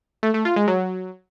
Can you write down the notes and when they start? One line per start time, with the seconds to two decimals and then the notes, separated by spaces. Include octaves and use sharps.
0.23 A3
0.34 A3
0.45 F4
0.56 G#3
0.68 F#3